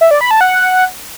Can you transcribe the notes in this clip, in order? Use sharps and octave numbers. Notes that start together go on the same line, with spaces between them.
E5
D5
B5
A5
F#5